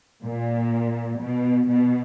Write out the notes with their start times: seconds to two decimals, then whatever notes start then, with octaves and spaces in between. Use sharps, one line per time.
0.23 A#2
1.19 B2
1.68 B2